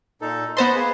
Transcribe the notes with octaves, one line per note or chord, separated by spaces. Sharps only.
A#2 D#4 A4
B3 B4 C5 D#5 A5 C6
A#3 G#4 B4